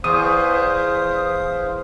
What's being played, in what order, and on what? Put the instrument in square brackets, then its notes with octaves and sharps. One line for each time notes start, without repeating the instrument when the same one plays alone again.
[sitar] E2 [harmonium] C5 F5 [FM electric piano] D#6